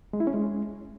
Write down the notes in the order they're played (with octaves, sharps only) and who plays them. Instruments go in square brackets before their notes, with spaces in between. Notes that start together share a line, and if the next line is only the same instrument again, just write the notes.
[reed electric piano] G#3
E4
C#4
G#3